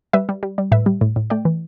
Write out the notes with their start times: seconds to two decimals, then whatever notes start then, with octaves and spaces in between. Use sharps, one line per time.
0.13 G3 B4 E5
0.29 G3
0.43 G3
0.58 G3
0.72 A2 B4 E5
0.86 G3
1.01 A2
1.16 A2
1.30 A3 D5 G5
1.45 E3